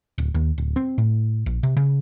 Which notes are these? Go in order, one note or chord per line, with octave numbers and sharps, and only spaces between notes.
D1
D#2
D1
C4
A2
A#1
C3
C#3